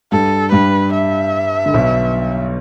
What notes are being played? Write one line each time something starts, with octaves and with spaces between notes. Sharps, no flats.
G2 G3 A4
G2 G3 B4
E5
D3
B1 B2